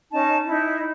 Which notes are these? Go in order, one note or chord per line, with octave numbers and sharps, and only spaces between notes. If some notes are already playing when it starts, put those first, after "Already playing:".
C#4 D#4 A5
D#4 E4